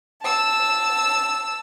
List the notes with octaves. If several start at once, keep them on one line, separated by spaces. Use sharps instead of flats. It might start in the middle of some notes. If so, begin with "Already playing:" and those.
A5 E6